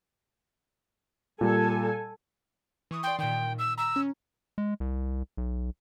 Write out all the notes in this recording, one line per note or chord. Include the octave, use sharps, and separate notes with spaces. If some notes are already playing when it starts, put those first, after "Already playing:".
A#2 G3 A4 G#5
E3 C#6 D#6
D5 G5 C6
A#2 D#3 G5
E6
A#5 E6
C#4
G#3
C2
B1